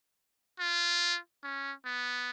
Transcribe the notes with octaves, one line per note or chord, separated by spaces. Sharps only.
F4
C#4
B3